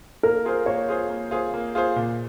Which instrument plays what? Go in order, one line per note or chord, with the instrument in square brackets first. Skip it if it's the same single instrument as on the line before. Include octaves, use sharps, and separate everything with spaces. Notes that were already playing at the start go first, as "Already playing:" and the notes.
[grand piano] A#3 [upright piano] A#4
[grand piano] F4 G#4 C5
[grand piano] A#3 [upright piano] C#5
[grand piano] F4 G#4 C5
A#3
F4 G#4 C5
A#3
F4 G#4 C5
A#2